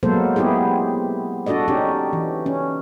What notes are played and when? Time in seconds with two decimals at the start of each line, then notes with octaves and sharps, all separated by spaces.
0.03 F#3 G#3 A#3 B3 A4 C5
0.36 B3 C4 E4 G4 G#4
1.46 D4 F#4 A4 D5 D#5
1.68 C#4 D#4 G4
2.13 E3
2.46 C#4